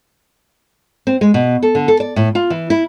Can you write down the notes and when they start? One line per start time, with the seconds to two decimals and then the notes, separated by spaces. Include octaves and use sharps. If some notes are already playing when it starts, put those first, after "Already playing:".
1.07 C4
1.21 G#3
1.34 B2
1.63 A4
1.75 D3
1.88 A4
2.00 D5
2.16 A2
2.35 F4
2.50 E3
2.70 E4